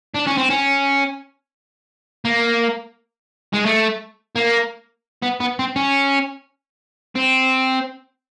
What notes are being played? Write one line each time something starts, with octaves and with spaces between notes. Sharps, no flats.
D4
C#4
C4
C#4
A#3
G#3
A3
A#3
B3
B3
C4
C#4
C4